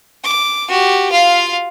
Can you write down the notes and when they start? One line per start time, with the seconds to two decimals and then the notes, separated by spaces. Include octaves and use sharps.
0.24 D6
0.68 F#4 G4
1.11 F4 F5